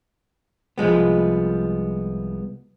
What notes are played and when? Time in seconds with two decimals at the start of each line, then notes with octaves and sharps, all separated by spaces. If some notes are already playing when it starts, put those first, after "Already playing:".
0.78 C2 F3 G#3 B3